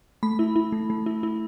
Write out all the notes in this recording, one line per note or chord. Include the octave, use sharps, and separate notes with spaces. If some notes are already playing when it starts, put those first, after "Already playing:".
A3 B5
E4
E4
A3
A3
E4
E4